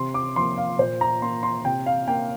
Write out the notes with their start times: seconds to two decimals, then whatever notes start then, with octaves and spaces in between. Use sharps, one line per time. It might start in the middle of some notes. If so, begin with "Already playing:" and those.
Already playing: C3 C6
0.14 D6
0.36 F3 A#3 C6
0.58 F5
0.79 A#2 C5
1.01 A#5
1.22 A#3 C6
1.43 C6
1.65 C3 G5
1.86 F5
2.08 A#3 G5